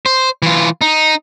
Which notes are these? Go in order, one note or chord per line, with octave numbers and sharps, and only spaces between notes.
C5
E3 F4
D#4